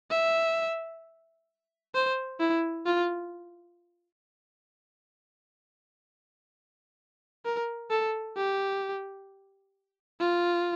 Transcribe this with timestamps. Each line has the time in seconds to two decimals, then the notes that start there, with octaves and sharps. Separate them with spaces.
0.11 E5
1.95 C5
2.40 E4
2.86 F4
7.45 A#4
7.91 A4
8.37 G4
10.20 F4